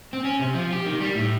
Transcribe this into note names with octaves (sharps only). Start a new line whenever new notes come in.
C4
C#4
C3
F3
G4
D#3
G3
A2